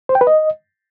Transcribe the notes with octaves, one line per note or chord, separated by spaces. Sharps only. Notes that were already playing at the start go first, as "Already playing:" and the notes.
C5
G5
B4
D#5